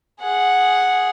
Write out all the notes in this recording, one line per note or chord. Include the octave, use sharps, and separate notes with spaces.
G#4 F#5